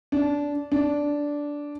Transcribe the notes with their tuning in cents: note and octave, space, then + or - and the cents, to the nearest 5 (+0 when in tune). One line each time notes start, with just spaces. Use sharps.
D4 -20
D4 -10